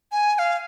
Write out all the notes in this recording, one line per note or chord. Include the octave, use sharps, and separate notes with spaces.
G#5
G#5
F5